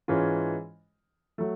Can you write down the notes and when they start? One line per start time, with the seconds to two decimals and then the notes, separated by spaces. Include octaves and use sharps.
0.08 G#2 E3 G#3 C#4 F4
1.38 F#3 A3